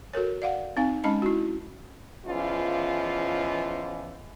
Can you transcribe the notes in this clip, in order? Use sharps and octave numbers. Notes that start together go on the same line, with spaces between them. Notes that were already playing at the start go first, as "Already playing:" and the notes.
F#4 A4 A#4 C#5
D5 F5 F#5
C4 D#4 F5 G#5
G#3 C#4 D#4 D#5 A5 B5
E4 F#4
E2 E3 F3 C#4 F4 D#5